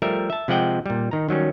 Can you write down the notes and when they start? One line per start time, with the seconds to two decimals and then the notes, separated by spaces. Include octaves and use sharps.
0.02 F3 G3 A3 A#4 E5
0.30 E5 A5
0.48 C3 F3 G#3 F#5 G5
0.86 A#2 G3
1.11 D#3 A#5
1.29 D#3 F#3 G3 C#4